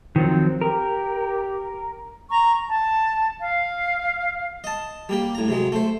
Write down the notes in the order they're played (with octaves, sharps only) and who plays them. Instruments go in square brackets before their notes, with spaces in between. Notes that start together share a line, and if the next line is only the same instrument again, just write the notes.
[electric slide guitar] D#3 F3 F#3 [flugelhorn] C4
[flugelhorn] G4 [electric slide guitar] A#4
[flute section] A#5 C#6
A5
F5
[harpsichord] D#5 A5
G3 A#3 G4
A2 A#5
C3 F#3 G#3
A3 C5